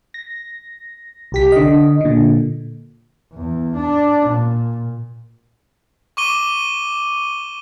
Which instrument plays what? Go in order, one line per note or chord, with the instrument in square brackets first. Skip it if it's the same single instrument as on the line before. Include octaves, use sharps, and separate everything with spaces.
[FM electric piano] A#6
C2 G4 B6
D3 D#5
A#2 D3
[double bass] E2
D4
A#2
[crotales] C#6 D6 D#7 G7